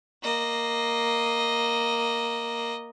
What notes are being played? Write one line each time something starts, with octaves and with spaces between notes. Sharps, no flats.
A#3 D#5